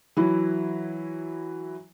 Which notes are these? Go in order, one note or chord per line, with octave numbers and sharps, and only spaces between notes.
E3 F#3 E4